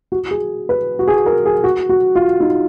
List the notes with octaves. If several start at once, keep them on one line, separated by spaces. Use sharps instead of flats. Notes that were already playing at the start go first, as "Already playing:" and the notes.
F#4
G#4
B4
F#4
G#4
A#4
G#4
F#4
F#4
F4
D#4